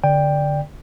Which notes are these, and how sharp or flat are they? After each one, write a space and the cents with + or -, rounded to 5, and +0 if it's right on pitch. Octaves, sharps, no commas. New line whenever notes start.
D3 -10 D5 +0 G5 +10